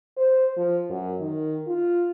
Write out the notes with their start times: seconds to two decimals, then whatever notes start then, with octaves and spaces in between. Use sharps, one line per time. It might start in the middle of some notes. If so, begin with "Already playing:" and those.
0.17 C5
0.57 F3
0.90 F#2
1.20 D#3
1.67 F4